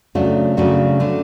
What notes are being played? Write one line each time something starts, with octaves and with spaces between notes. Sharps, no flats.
C#3 F#3 A3 D4 F#4
C#3 F#3 A3 D4 F#4
D3 A3